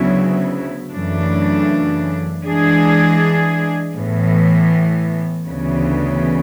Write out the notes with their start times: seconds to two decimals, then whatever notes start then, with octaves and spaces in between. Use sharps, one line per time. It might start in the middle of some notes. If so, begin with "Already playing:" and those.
Already playing: D2 C#3 F#3 B3 E4
0.92 F#2 C#3 E3 A3 D4
2.44 E3 G#3 D4 G#4
3.96 A2 E3 B3
5.48 D2 C#3 E3 B3